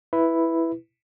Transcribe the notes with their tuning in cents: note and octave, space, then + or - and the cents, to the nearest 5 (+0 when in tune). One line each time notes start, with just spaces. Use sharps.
E4 +0 B4 +0